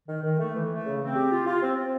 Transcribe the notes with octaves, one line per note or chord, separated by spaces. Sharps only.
D#3
D#3
A3
E3
A3
C#3
C4
G4
F4
F4
C4
C4